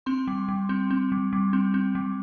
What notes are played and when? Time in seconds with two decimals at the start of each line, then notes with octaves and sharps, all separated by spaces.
0.06 C4 C6
0.27 G3
0.48 G3
0.69 C4
0.91 C4
1.12 G3
1.33 G3
1.53 C4
1.74 C4
1.95 G3